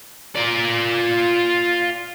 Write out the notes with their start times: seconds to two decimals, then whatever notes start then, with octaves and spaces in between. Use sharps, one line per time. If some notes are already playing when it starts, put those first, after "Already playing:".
0.36 F4 D5